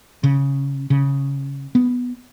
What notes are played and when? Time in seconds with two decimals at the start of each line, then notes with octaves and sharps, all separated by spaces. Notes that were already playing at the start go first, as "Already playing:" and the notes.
0.24 C#3
0.90 C#3
1.75 B3